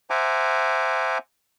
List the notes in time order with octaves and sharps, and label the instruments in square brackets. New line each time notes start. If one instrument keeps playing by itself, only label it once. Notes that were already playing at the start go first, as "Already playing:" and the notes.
[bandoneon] C5 E5 F#5 G#5 A#5 D6